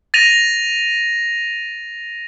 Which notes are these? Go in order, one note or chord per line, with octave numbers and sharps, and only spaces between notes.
A6 A#6 D#7 F7